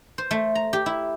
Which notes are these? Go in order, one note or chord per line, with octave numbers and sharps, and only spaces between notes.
C5
A3
A#5
G4
E4